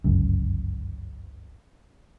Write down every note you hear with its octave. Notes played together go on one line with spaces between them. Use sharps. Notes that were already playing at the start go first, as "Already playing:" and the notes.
G1 C#2 F#2